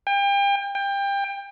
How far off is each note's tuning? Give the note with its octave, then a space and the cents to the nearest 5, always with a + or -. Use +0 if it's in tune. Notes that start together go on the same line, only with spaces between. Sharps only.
G5 +35
G5 +25